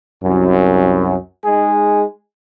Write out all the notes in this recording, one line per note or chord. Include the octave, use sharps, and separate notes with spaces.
C2 F#2
G#3 D#4 G#4